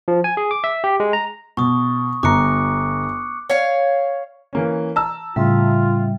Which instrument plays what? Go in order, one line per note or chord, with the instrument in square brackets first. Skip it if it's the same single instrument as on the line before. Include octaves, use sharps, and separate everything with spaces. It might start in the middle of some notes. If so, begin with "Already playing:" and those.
[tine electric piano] F3
G#5
G#4
D6
E5
G4
G#3
A#5
[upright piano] B2 [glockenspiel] C#6 D#6
[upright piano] G1 A#5 [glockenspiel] D6 F#6 C#7
[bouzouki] C#5 F5
[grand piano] E3 A#3 C#4
A5 A#5 E6
[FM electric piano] A2 C#3 E5 [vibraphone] G3 [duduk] F4